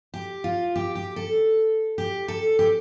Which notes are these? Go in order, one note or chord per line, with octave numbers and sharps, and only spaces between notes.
G4
F4
G4
G4
A4
G4
A4
G4